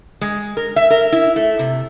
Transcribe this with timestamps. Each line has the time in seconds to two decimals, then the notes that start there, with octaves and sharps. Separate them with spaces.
0.21 G#3
0.57 A#4
0.76 E5
0.90 A#4
1.12 E4
1.36 A3
1.59 C3